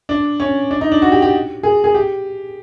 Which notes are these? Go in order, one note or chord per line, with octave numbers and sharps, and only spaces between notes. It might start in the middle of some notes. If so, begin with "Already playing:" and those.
D4
C#4
D4
D#4
D4
F#4
G4
G4
G#4
G#4
G4